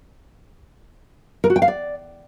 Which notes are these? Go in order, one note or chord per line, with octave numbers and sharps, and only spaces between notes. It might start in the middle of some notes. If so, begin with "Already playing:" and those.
A#4
F#4
G5
F5
D5